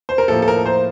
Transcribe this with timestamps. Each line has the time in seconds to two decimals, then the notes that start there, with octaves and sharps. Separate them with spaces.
0.09 C5
0.18 A#4
0.28 A2 F3 A#3 A4
0.42 A4
0.48 A#4
0.66 C5